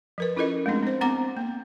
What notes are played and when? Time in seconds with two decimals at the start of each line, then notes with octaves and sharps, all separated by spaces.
0.18 F3 A#4 B4
0.36 C#4 E4 F4 A4 A#4 D#5
0.66 G#3 A3 C4 D4 G#4
0.82 C4 C5
1.01 B3 C4 F#5 A#5 D6
1.37 A#3